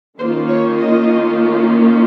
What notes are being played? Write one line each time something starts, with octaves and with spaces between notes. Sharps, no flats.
D#3 A#3 C#4 F4 C5
C#5
D#5